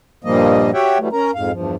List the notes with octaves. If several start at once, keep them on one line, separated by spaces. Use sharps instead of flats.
G2 A#2 F3 G3 A#3 D#5
F#4 G4 C#5 E5 F#5 G5
E3 F#3 G3 A3
C#4 A#4 A#5
F2 G#2 F5
E2 G2 F3